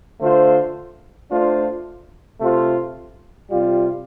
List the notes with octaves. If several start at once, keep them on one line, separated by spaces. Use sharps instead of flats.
D3 A3 F4 C5
A3 D4 F4 C5
C3 A3 F4 C5
C3 G3 F4